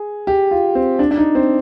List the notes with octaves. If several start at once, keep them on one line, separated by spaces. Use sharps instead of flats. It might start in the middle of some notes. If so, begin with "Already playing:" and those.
Already playing: G#4
G4
F4
C4
D4
D4
D#4
C4